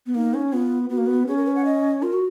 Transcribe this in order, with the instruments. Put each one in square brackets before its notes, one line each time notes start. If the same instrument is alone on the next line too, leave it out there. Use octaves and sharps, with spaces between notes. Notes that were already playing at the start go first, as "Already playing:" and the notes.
[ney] B3
[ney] A#3 [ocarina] D#4
[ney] C#4
[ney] B3 [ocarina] F4
[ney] B3 [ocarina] F#4
[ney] A#3
B3
[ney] C#4 [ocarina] G#4
[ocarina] A#4
B4
F#5
D#5
[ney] F4 [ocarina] A#4
[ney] F#4